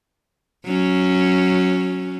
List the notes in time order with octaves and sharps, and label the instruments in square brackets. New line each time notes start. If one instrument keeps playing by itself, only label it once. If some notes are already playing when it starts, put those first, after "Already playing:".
[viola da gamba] F#3 C#4